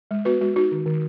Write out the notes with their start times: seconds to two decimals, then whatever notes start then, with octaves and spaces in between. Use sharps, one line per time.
0.11 G#3
0.25 B3 F#4 B4
0.41 G#3 F#4
0.56 D#4 F#4
0.72 D#3
0.86 D#3